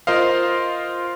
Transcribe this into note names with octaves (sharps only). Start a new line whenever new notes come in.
F4 A#4 C5 D#5 F5